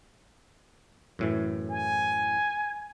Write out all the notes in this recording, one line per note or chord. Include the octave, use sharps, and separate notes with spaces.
F#2 A2 E3
G#5